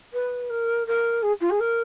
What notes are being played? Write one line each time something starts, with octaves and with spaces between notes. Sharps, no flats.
B4
A#4
A#4
G#4
F4
G#4
A#4